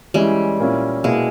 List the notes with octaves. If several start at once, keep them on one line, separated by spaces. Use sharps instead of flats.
E3 G3 G#3 C#4 E4
A#2 A#3 C#4 E4
B2 G#3 A#3 E4